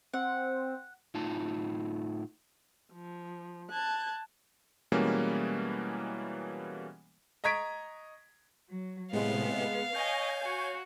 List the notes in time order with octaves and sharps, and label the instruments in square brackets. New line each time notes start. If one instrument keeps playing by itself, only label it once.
[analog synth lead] C4 [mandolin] F#5
[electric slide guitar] A2 D#4 F4 A5
[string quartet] F3
A5 F#6 G#6
[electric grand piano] B2 E3 G3 G#3 A#3 C#4
[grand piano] D#5 A#5 C#6 G#6 B6 D7
[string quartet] F#3
[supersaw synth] A2 C3 [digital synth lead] G#3 [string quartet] B3 [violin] F5
[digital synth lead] C#5 [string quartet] D#5 C#6 [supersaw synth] G#5 G6
[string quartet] F#4